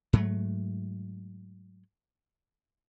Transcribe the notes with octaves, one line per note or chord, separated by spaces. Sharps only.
G#2 F#3 A3